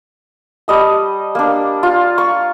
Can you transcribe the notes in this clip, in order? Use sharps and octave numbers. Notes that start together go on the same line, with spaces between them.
G3 D#5 A5
A#3 D4
F4
C#6